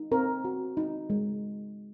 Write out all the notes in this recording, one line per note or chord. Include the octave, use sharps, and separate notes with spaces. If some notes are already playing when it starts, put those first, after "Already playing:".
Already playing: D#4
C4 A#4
F#4
D#4
G#3